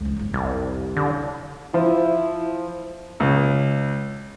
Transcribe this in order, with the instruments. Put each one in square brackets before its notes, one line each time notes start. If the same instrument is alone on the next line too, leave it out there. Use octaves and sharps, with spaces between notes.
[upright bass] C#2 F3
F#1 E2
[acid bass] C2 [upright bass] F2
[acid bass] D3
[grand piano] F3 [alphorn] E4
[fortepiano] C#2